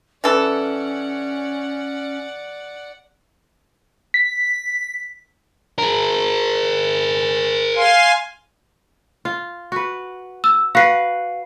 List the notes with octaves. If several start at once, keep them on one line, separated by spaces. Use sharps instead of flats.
E3 C#4 A4 D5 F#5
B6
G#4 A#4
F5 G#5 C6
F4
F#4 B4
E6
F#4 B4 F5 C7